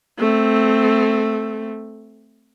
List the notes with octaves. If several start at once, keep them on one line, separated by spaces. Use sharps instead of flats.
A3 C4